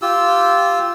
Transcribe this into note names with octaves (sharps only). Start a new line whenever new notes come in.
F4 G4 E6